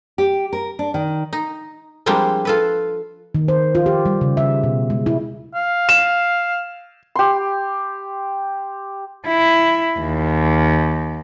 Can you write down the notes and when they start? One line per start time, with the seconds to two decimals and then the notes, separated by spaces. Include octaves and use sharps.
0.18 G4
0.53 A#4
0.79 D4
0.94 D#3
1.33 D#4
2.06 F3 G3 G#3 A#3 C4 D4
2.45 F4 A4 B4
3.35 D#3
3.48 C5
3.75 F4
3.86 G4
4.06 G3
4.21 C#3
4.37 E5
4.63 B2
4.90 G#3
5.06 E4
5.55 F5
5.89 E7
7.15 G4 C6
9.27 E4
9.99 D#2